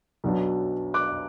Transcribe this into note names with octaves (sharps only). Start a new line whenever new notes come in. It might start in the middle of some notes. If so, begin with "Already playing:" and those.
B1 B2 F#3 B3 D4
D6 F#6